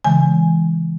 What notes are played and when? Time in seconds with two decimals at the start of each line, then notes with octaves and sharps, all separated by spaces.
0.04 C#3 E3 G#3 G#5